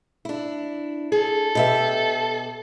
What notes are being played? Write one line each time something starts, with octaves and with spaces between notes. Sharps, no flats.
D4 E4
G#4 A4
B2 G4 E5